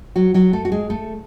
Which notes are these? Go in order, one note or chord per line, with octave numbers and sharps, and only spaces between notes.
F#3 F#4
F#3 F#4
A3 A4
F#4
G#3 G#4
A3 A4